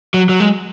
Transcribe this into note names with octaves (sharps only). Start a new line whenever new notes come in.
F#3
F#3
G#3